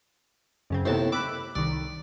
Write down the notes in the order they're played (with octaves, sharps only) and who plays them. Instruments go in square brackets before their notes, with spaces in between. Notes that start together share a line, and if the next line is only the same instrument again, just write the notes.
[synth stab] F#2 C#3 C4
[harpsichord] D#2 A2 A5 [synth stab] C3 B3 C4
[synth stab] B5 E6 F#6 [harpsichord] D6
[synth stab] C2 D#3 [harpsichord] D5